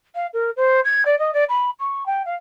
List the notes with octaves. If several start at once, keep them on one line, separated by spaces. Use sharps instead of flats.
F5
A#4
C5
G#6
D5
D#5
D5
B5
C#6
G5
F5